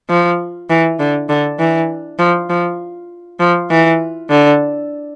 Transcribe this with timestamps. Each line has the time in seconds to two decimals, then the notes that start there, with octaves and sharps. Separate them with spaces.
0.10 F3
0.70 E3
0.99 D3
1.29 D3
1.60 E3
2.19 F3
2.50 F3
3.40 F3
3.70 E3
4.30 D3